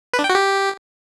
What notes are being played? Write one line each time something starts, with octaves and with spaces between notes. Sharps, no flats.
B4
D4
G5
F#4
G4